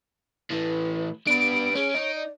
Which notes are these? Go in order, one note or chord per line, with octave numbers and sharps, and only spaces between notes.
A2 E3 B4
B3 D4 B4 D7
C#4 G#4
D#4 C#5
D5